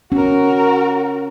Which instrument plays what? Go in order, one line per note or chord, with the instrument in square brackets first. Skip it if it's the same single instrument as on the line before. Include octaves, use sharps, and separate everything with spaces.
[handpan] C#4 [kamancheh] F#4 A#4